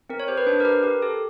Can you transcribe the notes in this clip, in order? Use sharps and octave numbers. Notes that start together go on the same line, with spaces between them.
C4 A#4
C#5
G4 C5
B4
D4 C5
A#4
G4 B4
G4 A#4
G4 A4